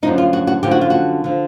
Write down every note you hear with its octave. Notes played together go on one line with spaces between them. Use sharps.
F#2 D3 F3 D#4
F4
F#4
F#4
F#2 D3 F3 G4
F#4
F4
F#4
D3 F3